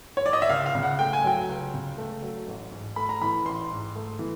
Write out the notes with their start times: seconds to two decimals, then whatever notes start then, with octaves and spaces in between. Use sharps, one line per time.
0.17 C#5
0.26 D5
0.33 D#5
0.42 E5
0.49 C#2 F5
0.66 F5
0.75 C#3
0.83 F#5
0.99 A3 G5
1.13 G#5
1.24 F#3 G5
1.49 C#2
1.74 C#3
1.98 A3
2.22 F#3
2.47 A1
2.72 G#2
2.96 A3 B5
3.09 A#5
3.21 E3 B5
3.45 A1 C6
3.71 G#2
3.95 A3
4.19 E3